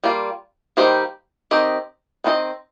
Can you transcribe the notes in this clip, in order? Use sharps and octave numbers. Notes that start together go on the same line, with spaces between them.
G3 A#3 F4
D#3 G3 A#3 G4 C5
D#3 C4 G4 D#5
D#3 C4 F4 D#5